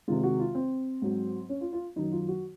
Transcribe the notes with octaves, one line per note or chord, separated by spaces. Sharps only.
C3 D#3 G#3 F4
F#4
F4
C4
G#2 F#3
C#4
F4
F4
F#2 D#3 F#3 D#4
F4
F#4